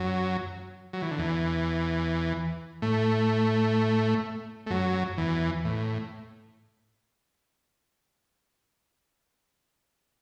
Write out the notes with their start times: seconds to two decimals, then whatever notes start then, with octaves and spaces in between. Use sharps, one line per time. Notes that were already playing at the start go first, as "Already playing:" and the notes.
Already playing: F#2 F#3
0.93 F#3
1.02 E3
1.11 D3
1.18 E2 E3
2.82 A2 A3
4.66 A3
4.70 F#2 F#3
5.18 E2 E3
5.65 A2